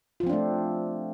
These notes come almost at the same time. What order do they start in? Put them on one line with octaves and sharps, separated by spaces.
F4 F3 C4 D4 A3